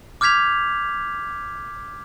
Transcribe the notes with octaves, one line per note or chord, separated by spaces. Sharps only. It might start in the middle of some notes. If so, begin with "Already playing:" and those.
D6 F6 G6 G#6 B6 F7